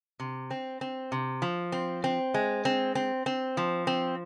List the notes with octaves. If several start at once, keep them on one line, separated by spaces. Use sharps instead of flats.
C3
C4
C4
C3
F3
C4
C4
G#3
C4
C4
C4
F3
C4